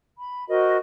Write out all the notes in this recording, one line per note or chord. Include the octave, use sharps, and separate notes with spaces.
B5
F#4 A#4 C5 D#5